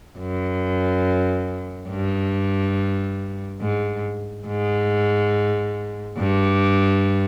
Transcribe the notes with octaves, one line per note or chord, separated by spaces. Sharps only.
F#2
G2
G#2
G#2
G2